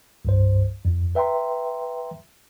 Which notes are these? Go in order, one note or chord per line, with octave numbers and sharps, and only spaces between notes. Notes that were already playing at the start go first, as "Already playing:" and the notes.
C2 G2 C5
F2
B4 E5 G5 A#5 C6